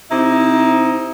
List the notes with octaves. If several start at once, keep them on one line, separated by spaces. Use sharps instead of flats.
C3 D#4 E4